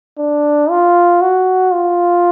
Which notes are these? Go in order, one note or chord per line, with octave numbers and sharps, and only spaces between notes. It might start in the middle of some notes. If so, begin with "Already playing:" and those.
D4
F4
F#4
F4